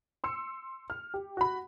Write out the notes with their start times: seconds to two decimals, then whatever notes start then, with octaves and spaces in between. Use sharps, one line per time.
0.24 C6 E6 C#7
0.90 F6
1.14 G4
1.37 F#4 B5